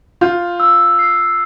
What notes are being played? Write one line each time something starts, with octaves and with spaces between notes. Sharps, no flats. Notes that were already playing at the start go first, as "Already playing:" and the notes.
F4 G6
E6
C7